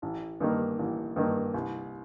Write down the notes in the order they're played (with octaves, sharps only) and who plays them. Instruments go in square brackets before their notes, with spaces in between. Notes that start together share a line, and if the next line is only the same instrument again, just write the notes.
[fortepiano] A1
G2 D#3 A#3
A1
G2 D#3 A#3
C2